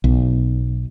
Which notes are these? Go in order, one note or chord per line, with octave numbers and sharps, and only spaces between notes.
B1